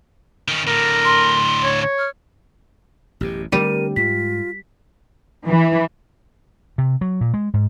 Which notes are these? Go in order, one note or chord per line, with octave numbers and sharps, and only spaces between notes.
D#3 C#4
A2 D3 A#4
C6
C#5
C#5
F6
A1 F#2 B2 G4
D3 G3 A3 C4 G4 A#4 D#7
G#2 F4 B6
E3
C3
F#3
A#2
G#3
G#2